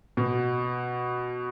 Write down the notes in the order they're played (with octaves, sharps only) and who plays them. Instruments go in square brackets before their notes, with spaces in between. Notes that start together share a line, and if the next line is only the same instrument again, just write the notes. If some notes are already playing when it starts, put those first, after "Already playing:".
[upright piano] B2